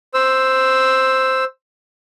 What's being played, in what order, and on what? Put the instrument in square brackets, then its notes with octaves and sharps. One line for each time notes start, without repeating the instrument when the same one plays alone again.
[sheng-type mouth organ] C5 E6